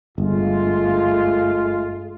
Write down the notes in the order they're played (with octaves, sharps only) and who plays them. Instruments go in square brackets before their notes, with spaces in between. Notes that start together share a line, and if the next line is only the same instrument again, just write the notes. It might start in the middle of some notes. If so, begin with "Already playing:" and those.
[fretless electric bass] G1 [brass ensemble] G#3 A3 F4